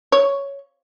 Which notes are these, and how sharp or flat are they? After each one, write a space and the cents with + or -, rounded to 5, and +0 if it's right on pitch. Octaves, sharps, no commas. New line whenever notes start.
C#5 +5